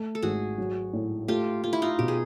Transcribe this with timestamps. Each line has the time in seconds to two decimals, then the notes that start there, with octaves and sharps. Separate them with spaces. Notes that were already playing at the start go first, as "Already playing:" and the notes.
Already playing: A3
0.15 A4
0.22 G#1 F#4 G#4
0.58 F#3
0.93 A2
1.28 A3 F4 G4
1.64 A3 F4
1.73 E4
1.82 D#4 F4
1.99 B2 G4
2.08 G#4